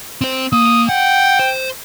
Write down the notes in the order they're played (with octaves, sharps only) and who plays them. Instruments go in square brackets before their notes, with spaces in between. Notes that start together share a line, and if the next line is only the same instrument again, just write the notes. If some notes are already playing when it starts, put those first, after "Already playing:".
[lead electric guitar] C4 C5
[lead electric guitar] A#3 [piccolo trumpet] D#6
[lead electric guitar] F#5 [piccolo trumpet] G5
[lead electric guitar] C5